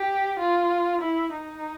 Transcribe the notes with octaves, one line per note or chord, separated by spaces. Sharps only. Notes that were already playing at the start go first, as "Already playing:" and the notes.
Already playing: G4
F4
E4
D#4